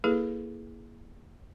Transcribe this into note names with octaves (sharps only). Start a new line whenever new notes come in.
A#3 E4 G#4 A4 B4